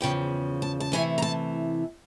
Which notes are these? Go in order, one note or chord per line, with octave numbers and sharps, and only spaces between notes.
E2 C#3 F3 G5
A5
A5
F2 C3 E3 A3 G#5
A#5
A5